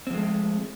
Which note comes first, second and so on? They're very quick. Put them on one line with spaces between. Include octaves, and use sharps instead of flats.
C4 F3 G#3 A3